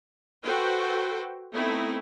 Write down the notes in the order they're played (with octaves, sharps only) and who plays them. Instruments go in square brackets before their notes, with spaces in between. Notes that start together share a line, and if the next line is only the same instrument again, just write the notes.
[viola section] F#4 A4 B4 C5 G5
A3 B3 C4 D#4 E4 A4